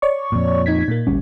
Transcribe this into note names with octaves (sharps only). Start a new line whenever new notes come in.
C#5 D5 C#6
F2 A#2
D#4 G#6 B6
A#2 A#3
G#1 D2 G3 C#4